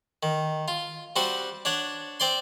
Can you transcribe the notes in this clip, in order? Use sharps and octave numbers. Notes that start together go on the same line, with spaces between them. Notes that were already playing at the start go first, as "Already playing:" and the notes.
D#3
F4
G3 C4 F#4 F#5
D4 C#5 F#5
C4 D5 C6